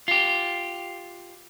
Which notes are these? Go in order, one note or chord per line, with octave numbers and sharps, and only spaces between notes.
F4 G4